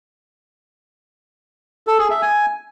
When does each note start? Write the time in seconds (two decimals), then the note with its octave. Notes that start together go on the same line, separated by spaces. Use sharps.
1.87 A4
1.99 G#4
2.10 E5
2.22 G#5